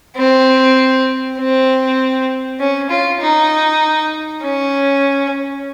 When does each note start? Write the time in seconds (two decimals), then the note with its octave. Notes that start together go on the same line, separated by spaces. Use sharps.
0.17 C4
1.38 C4
2.60 C#4
2.90 F4
3.21 D#4
4.42 C#4